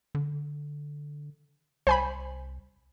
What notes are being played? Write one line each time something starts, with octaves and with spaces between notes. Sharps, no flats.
D3
C2 C5 G#5 B5